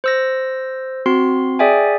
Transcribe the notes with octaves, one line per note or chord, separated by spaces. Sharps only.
C5 E6 A#6
C4 F#4 C6 C7
G#4 D5 E5 G5 G#5